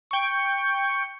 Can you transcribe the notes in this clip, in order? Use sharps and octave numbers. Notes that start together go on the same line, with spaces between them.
G5 C#6